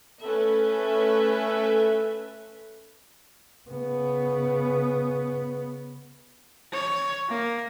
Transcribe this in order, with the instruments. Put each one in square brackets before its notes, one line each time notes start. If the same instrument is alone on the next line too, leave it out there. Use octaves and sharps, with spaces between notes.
[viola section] A3 C#4 A4 B4 E5
[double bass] C#3 B3
[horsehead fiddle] C#5
A#3